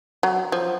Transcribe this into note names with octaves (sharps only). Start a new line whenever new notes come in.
F#3
F3